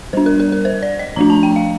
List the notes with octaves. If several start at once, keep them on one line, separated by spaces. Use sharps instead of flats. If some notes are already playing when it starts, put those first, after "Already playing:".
G3 D4 C5
A#4
A#4
A#4
C5
D5
D#5
F3 A3 D4 A#5
A5
G5
F5